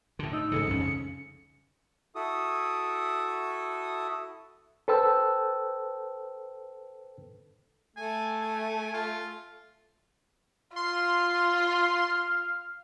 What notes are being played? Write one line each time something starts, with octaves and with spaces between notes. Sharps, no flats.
A2 D3
D#4 E6
G#2 C#3 E3 A4 C#7
C2 F2 C#4
C#3
E4 F#4 A4 D#6
A4 B4 C5 G5 A5 E6
A3 G#5
G#5
F4
F4 F5 C6